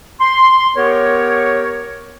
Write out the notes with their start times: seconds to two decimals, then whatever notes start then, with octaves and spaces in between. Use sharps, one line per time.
0.20 C6
0.76 B3 G4 A#4 C#5